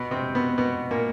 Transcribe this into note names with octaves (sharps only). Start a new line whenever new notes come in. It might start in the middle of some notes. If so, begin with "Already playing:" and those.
Already playing: B2 B3
C3 C4
B2 B3
B2 B3
A#2 A#3